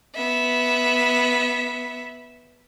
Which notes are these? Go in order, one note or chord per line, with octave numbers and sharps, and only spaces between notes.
B3 E5